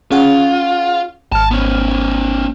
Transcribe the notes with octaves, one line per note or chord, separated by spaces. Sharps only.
C#4 F4 G#4 F#5
G#1 A5 F6
B3 C#4